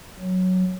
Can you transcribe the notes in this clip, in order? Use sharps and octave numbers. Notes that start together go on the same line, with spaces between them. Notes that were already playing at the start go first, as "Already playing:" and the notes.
F#3